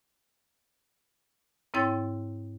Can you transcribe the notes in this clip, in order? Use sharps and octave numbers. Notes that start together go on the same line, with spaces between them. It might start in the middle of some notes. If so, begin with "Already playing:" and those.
G#2 C4 E4 C#5 G5 A6